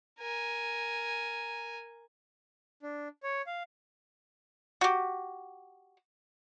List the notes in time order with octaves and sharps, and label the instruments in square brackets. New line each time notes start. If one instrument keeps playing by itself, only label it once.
[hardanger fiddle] A#4 G#5
[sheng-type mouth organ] D4
C#5
F5
[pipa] F#4 G4